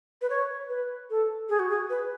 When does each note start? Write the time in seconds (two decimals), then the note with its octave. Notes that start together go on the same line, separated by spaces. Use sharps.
0.22 B4
0.30 C#5
0.69 B4
1.10 A4
1.49 G#4
1.59 F#4
1.70 G#4
1.90 B4